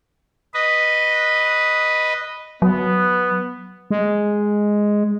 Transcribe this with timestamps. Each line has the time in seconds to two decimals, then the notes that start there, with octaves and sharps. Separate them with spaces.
0.54 B4 D#5
2.62 F#3 B3
3.91 G#3